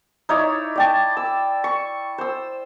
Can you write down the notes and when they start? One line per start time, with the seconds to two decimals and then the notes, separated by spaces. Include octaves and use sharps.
0.29 D#4 E4 C#5 D5
0.75 D5 G5 A5
1.17 E6
1.64 C#6
2.18 C5 E6